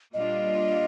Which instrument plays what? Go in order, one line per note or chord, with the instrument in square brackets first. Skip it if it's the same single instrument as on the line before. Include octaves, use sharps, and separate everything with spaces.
[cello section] A#2 G3 D4 F4 [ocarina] D#5